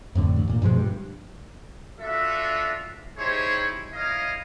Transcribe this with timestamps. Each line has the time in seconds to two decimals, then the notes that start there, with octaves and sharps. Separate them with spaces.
0.15 F2 A2 D3
0.36 A1
0.49 A#2
0.62 G2 B2 F3 G#3
0.76 G2
2.00 D4 F4 F#4 A4 E5
3.18 D#4 E4 G4 G#4 C5 C#5
3.93 E4 A#4 C#5 D#5 F5